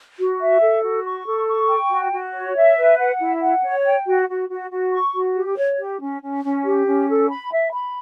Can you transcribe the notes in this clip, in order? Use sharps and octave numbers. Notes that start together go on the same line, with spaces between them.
F#4
E5
A4
F#4
C#6
A4
C#6
G5
F#4
F#4
C#5
E5
B4
F#5
E4
F#5
C#5
G5
F#4
F#4
F#4
F#4
C#6
F#4
G4
C#5
G4
C#4
C#4
C#4
G4
C#4
A4
B5
E5
B5